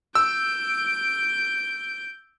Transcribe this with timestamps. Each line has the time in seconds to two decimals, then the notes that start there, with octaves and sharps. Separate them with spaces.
0.15 E6 G6 D7